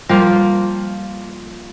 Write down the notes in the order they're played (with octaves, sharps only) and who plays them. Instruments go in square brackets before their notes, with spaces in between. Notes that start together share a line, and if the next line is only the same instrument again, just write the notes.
[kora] F3 A#3 F4 [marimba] G3